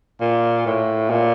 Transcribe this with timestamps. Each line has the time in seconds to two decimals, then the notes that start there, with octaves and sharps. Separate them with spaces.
0.21 A#2
0.66 A2
1.10 A#2